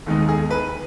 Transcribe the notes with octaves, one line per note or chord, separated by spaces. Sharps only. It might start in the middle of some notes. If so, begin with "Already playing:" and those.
D#2 D#3 G#3 B3 D#4
G#4
B4